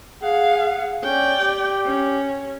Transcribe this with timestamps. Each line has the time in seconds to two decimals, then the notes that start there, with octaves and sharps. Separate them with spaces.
0.22 G#4 F5 F#5
1.04 C#4 D5 G5
1.40 G4
1.86 C#4